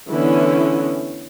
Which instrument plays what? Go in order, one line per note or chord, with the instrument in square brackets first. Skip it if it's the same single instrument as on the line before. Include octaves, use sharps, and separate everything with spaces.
[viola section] D3 E3 A3 B3 C#4 E4